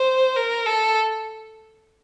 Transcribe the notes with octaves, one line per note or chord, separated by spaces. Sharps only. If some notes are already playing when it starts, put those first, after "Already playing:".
Already playing: C5
A#4
A4